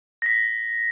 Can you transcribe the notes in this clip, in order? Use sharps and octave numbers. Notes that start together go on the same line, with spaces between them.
A#6 B6